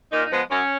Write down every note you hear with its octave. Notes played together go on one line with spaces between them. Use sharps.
A#2 D#4
D#4
F3 G#3 B3
F#2 C#4